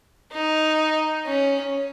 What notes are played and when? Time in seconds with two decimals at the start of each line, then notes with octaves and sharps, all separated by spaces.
0.32 D#4
1.26 C#4